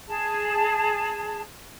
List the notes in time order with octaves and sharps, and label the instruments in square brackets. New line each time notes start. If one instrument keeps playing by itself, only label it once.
[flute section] G#4 A5